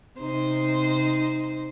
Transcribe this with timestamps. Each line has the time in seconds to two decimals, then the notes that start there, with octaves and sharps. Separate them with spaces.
0.19 C3 D#4 C5